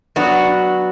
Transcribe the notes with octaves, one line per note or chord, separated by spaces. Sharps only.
F#3 B3 D4 F#4